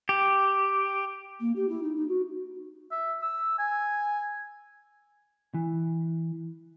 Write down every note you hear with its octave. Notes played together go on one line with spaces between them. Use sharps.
G4
A#3
G4
E4
D#4
D#4
F#4
E5
E6
G#5
E3